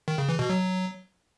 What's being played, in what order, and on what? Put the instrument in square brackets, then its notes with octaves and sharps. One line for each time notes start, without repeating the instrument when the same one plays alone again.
[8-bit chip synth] D#3
C#3
E3
B2
F#3